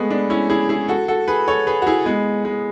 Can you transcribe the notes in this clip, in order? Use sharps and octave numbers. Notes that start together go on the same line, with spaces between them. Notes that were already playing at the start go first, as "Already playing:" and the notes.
Already playing: G#3 A3 B3
B3 D4
C#4 E4
E4 G#4
E4 G#4
F#4 A4
F#4 A4
G#4 B4
A4 C#5
G#4 B4
F#4
E4 G#4
G#3 B3
G#3